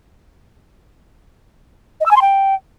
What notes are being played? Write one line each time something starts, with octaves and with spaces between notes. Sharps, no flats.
D#5
E6
G#5
C6
G5